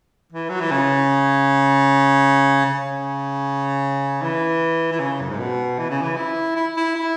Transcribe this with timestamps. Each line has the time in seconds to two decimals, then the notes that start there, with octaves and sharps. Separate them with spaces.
0.32 E3
0.49 F#3
0.60 E3
0.71 C#3
2.66 C#3
4.22 E3
4.92 E3
5.00 C#3
5.21 F#2
5.30 G#2
5.39 B2
5.78 E3
5.90 C#3
6.02 E3
6.17 E4
6.56 E4
6.77 E4
6.95 E4